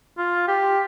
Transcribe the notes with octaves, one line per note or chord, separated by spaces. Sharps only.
F4
G4